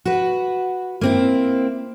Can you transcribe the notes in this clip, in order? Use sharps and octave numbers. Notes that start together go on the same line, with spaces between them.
F#4 B4
A#3 C4 E4